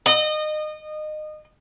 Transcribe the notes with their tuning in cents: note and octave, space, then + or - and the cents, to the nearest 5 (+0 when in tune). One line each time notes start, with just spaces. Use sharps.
D#5 -25